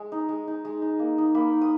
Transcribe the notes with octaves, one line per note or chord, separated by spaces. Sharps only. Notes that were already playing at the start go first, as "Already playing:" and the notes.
Already playing: G#3
D#4
G#3
D#4
G#3
D#4
A#3
D#4
A#3 B5
D#4
D#6